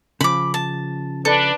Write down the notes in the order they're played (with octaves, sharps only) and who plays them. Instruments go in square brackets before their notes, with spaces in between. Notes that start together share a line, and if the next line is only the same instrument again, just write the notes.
[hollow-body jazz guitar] C#3 F3 [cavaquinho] B5 D6
[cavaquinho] A5
[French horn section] D4 B4 [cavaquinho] A4